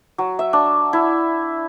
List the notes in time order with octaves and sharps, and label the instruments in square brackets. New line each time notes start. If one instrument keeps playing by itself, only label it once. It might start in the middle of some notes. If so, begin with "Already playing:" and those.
[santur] F#3
E5
D4
E4